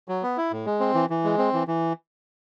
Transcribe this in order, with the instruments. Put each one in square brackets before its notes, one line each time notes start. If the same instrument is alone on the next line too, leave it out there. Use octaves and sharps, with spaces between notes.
[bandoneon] F#3
B3
E4
A2
G#3
C4
E3
E3
G#3
C4
E3
E3